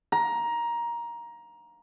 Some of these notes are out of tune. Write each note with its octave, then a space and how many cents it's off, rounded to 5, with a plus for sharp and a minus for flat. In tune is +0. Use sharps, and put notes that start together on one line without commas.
A#5 +15